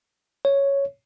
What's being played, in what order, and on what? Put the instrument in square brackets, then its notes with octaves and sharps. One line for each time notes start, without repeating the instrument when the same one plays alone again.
[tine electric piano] C#5